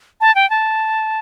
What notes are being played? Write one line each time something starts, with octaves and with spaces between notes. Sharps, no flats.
A5
G5
A5